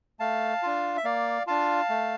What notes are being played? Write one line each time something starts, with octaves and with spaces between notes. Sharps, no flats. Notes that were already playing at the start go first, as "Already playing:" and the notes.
A3 F5 A5
D4 F4
E5
A#3 D5 F5
D4 F4 F5 A5
A3